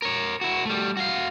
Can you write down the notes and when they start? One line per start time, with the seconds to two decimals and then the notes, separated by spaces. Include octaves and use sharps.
0.02 A#4 C#5
0.41 E4 F#4
0.65 G3 A3
0.97 F#4 F5